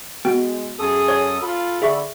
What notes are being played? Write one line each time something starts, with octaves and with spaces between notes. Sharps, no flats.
G#3 B3 F#4 G5
F#2 G#4 A4 D#6
C#5
F4 A4 B5
D3 G#4 E5 C#6